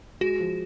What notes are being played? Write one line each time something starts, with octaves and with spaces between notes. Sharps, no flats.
G#3 F#4
F3